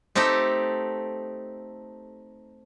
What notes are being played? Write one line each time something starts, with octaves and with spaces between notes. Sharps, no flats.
A3 C4 D#4 G4 A4